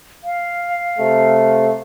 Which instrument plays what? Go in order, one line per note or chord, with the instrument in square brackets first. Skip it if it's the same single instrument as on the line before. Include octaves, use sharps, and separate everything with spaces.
[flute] F5
[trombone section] C3 A3